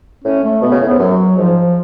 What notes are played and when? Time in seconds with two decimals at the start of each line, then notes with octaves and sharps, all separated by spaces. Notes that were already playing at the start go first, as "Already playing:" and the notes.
0.24 A2 C#4
0.43 A3
0.62 B2 B3
0.71 C#3
0.81 A2
0.87 G#2 B3
0.99 F#2 F#3
1.37 G#2 F3